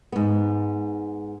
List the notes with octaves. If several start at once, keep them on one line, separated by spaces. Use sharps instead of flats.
G#2 B3